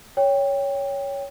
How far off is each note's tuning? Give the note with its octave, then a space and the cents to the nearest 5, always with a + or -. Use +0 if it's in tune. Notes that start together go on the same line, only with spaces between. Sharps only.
C#5 +10 G5 +10